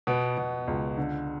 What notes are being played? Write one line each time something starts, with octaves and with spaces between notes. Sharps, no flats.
B2 B3
B2
C#2
D3